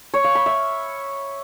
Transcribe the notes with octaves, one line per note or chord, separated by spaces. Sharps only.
C#5
F5
B5
E5